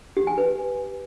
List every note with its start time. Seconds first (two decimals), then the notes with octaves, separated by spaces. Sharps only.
0.17 G4
0.27 G#5
0.38 B4